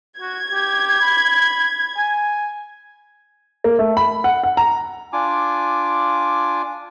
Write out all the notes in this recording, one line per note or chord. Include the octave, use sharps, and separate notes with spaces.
F#4 G#6
G4
B5
G#5
A#3
A3
B5
F#5
F#5
A#5
D4 F4 G#5 D6